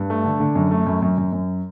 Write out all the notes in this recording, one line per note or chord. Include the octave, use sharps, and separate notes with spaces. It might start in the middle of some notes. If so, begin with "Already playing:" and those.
Already playing: G2
A3
D3
D3
F#2
A3
F#2
F#2
F#2
F#2